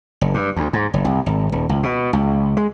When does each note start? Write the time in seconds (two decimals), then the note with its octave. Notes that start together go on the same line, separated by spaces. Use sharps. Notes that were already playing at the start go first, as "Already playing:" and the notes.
0.21 F#1
0.34 G2
0.56 D2
0.73 G#2
0.94 F#1
1.05 C2
1.26 G#1
1.52 D#1
1.69 C#2
1.83 B2
2.13 C#2
2.57 G#3